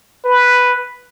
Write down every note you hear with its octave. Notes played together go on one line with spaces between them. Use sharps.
B4